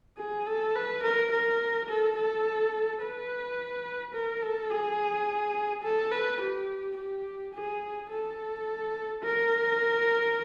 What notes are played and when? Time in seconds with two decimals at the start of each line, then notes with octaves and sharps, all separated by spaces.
0.18 G#4
0.47 A4
0.76 B4
1.03 A#4
1.32 A#4
1.89 A4
2.17 A4
3.02 B4
4.14 A#4
4.42 A4
4.71 G#4
5.84 A4
6.12 B4
6.41 G4
6.97 G4
7.54 G#4
8.10 A4
9.23 A#4